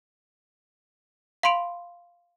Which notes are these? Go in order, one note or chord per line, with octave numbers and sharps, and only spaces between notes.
F5 B5 C6 D7 F7